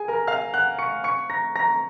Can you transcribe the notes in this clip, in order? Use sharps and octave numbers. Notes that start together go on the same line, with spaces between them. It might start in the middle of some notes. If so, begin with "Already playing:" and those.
Already playing: G#4 G#5
A#4 A#5
F5 F6
F#5 F#6
C#6 C#7
C#6 C#7
A#5 A#6
A#5 A#6